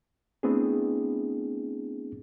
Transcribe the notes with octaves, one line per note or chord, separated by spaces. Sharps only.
A3 B3 C4 D4 E4 G#4